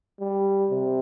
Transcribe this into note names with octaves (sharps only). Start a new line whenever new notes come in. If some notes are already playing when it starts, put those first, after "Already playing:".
G3
C3